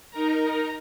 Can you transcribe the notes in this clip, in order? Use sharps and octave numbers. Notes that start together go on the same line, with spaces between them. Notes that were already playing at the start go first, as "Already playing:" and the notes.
D#4 A#4 A#5